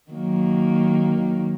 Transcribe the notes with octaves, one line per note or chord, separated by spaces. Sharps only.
D#3 F#3 A#3